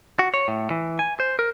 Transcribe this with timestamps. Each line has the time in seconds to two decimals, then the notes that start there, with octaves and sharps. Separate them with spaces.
0.19 F#4
0.34 C#5
0.48 A2
0.70 E3
0.99 G#5
1.20 C5
1.39 A#4